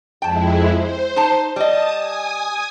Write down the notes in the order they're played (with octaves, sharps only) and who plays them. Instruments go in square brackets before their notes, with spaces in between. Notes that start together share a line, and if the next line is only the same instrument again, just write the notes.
[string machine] F2 G#3 E4 [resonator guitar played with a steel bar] G5 A5
[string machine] C5
[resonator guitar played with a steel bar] D#4 A5
[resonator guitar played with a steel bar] G3 D#5 [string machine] A5 D#6
[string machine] G#5 D#6